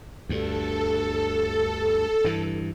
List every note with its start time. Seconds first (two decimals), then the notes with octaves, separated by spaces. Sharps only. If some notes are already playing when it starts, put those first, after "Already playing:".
0.29 D2 G2 A4
2.24 G2 E3